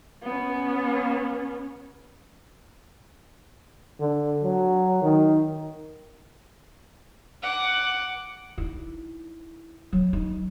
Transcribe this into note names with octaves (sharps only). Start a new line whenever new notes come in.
B3 C#4
D3
F#3
D#3
F#5 D6
D#4 E4
F#3
D#4